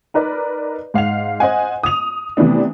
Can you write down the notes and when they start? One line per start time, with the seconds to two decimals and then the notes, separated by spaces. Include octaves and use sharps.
0.14 D#4 A#4 B4 D5
0.94 G#2 F5 F#5 F7
1.40 C5 D#5 F#5 G#5
1.83 D#6 F7
2.37 C3 E3 A3 B3 D4